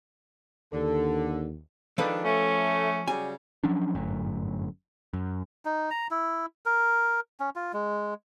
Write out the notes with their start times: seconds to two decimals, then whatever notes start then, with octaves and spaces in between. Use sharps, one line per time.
0.73 D#2 D3 A4
1.98 D#3 F3 G#3 D4 A4 B4
2.25 A3 C#4
3.08 C#3 F#3 G3 G#5
3.64 F3 F#3 C#4 D4
3.95 G1 F#2 A2
5.14 F#2
5.65 D#4
5.91 A#5
6.11 E4
6.66 A#4
7.40 C#4
7.56 F4
7.73 G#3